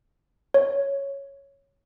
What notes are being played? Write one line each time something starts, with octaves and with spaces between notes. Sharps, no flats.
C#5